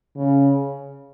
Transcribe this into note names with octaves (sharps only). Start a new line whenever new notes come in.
C#3